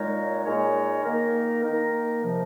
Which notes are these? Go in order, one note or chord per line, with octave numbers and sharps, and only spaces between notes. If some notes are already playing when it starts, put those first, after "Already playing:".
Already playing: A#2 G#3 D#4 A#4 C#5
A#2 G#3 D#4 A#4 C#5
D#3 A#3 D#4 A#4
D#3 A#3 D#4 A#4
C3 F3